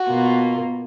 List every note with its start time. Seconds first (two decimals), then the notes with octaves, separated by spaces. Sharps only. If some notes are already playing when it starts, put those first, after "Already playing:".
Already playing: F#4
0.09 B2 A#3 F4